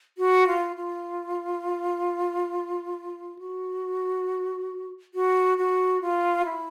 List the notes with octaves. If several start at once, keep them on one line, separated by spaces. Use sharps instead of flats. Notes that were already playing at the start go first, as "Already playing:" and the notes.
F#4
F4
F4
F#4
F#4
F#4
F4
E4